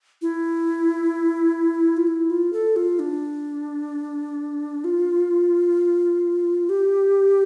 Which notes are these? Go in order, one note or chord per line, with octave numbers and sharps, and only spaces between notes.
E4
F4
E4
F4
A4
F4
D4
F4
G4